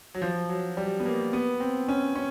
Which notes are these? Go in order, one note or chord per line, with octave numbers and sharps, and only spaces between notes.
F#3
F3
F#3
G3
B3
A#3
B3
C4
C#4
C#4